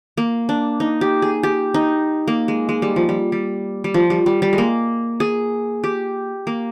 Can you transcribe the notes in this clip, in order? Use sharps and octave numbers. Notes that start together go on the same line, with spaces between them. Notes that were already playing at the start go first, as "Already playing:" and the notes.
A#3
D4
D#4
G4
G#4
G4
D#4
A#3
G#3
G#3
G3
F3
G3
G3
G3
F3
G3
G3
G3
G#3
A#3
G#4
G4
A#3